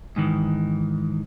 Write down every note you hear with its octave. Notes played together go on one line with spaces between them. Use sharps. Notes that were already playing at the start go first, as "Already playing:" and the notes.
G#2 D#3 E3